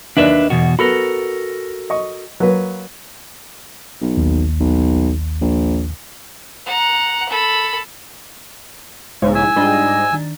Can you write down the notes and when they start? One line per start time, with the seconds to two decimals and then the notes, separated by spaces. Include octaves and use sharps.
0.17 D#2 D4 B4 D5 E5
0.50 E2 B2 F#4
0.79 B3 F#4 A4 A#4 B5
1.90 D#5 C#6
2.40 F#3 A#3 B4
4.01 B1
4.17 A1 D#2
4.60 B1
5.41 A#1
6.66 F#5 A#5
7.29 A4 B5
9.22 B1 G#2 C#3 G#3 C#5
9.35 E4 G#5 E6
9.56 G#2 G3 D4 F4 D#5
10.13 D#3 D4